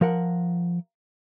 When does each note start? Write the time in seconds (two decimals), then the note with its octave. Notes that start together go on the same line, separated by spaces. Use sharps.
0.01 F3 A#4 F#5